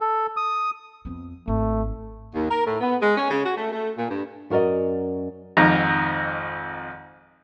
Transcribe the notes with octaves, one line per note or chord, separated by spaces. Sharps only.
A4
D#6
F2 B3
G#1 A3
D#2
A#4
A2
B3
G#3
C#4
C#3
F#4
A3
A3
A#2
G2
F#2 F#4 A#4 D5 D#5
G#1 F2 D#4 A#5